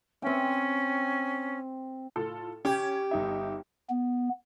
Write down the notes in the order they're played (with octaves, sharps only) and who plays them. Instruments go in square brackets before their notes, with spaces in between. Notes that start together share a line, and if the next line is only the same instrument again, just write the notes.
[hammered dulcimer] C4 G5 [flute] C#4
[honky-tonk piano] A2 F4 A4
[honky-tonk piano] C#4 G#6 [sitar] G4
[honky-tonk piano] G1 D#4 E5
[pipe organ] B3